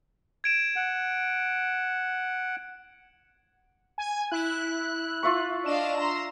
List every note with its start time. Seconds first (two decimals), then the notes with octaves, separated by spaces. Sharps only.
0.44 G#6 D7 E7
0.76 F#5
3.98 G#5
4.31 E4 F#6
5.23 F4 E5 C#6
5.66 D4 D#5 F5 E7
5.98 A#5 C6